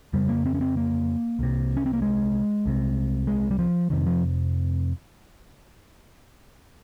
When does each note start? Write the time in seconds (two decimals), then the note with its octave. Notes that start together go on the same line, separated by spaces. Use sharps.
0.13 F2 C#3 G3
0.29 A#3
0.46 C4
0.55 C#4
0.61 C4
0.77 A#3
1.39 C2 C3
1.77 C#4
1.86 C4
1.93 A#3
2.02 G#3
2.65 C2 C3
3.27 G#3
3.51 G3
3.59 F3
3.90 F2 C3 D#3
4.06 F3